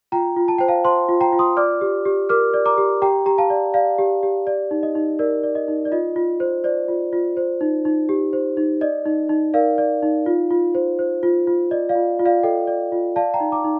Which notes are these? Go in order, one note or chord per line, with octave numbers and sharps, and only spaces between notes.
F4 G5 A#5
F4
A5
C5 G5
F5 A5
C5 A5 C6
F4
G5 A#5
F4
C6 D#6
D5 D6 F6
G4
G4
A#4 D6 F6
D5
A#5 D6
G4
G4 G5 A#5
G4 A#5
F5 A5
D5
D5 F5
G4
G4
D5
D#4
D#5
D#4
A#4 D5
D5
D#5
D#4
D5
F4 D#5
F4
C5
C5 D5
F4
F4
C5
D#4
D#4
G4
C5
D#4
D5 D#5
D#4
D#4
A#4 D5 F5
D5
D#4
F4
F4
C5
C5
F4
F4
D5 D#5
D5 F5
F4
F4
D5 F5
A4 D#5 G5
D5
F4
D5 F5 A5
G5 A#5
D#4
A#5 D6
D#4